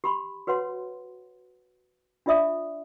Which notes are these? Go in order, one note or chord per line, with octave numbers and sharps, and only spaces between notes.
G4 B5 C6
F#4 B4 C#5 F#5 C6
D4 F4 D5 E5 D#6